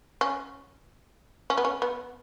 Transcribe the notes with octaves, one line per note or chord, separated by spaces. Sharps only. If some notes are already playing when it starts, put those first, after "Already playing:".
C#4
C#4
B3
C#4
B3